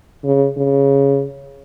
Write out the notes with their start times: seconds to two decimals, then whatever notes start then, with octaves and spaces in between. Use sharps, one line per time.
0.24 C#3
0.57 C#3